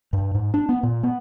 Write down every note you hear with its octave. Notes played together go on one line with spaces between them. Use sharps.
G2
G#2
D4
B3
A#2
B3